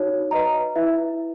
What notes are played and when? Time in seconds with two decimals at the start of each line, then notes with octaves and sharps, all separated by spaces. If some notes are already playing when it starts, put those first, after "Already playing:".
Already playing: D#4 F#4 C#5
0.31 B4 D#5 A#5
0.75 E4 B4 E5